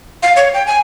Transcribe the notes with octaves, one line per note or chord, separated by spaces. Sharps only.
F5
C#5
G5
G#5